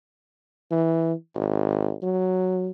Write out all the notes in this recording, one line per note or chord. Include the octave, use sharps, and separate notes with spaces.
E3
G#1
F#3